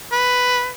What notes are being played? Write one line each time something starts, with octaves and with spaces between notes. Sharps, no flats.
B4